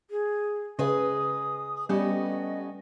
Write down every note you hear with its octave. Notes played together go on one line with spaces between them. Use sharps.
G#4
C#3 G#4 B4 D#5 D#6
G3 A3 B3 C#4 D#5